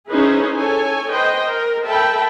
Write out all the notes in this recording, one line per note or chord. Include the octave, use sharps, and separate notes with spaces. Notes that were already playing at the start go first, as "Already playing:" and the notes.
C#4 D#4 E4 G#4 B4 C5
A4 C#5 G#5
B4 C5 D#5 G5
A#4
A4 A#4 E5 G5 A5 B5